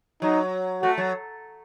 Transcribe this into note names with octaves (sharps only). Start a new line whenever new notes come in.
F#3 D#4
A3 F#4
F#3